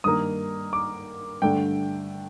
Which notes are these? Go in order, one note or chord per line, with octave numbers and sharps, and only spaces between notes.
G2 D#3 A#3 D#4 D#6
D6
G2 D3 A3 D4 G5